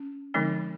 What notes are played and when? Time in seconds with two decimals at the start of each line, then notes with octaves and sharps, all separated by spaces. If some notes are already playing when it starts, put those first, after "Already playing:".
Already playing: C#4
0.34 D3 F3 G#3 C4 D#4